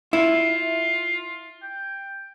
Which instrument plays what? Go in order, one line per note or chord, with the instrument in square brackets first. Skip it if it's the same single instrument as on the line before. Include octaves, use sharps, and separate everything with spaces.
[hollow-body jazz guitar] E4 [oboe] F4
[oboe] G5